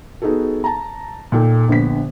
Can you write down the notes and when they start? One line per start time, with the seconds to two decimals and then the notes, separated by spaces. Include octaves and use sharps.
0.22 B3 D#4 F#4 G#4 A4
0.64 A5 A#5
1.32 A#2 D#4 A4 G5
1.68 A#1 D3 B3 B6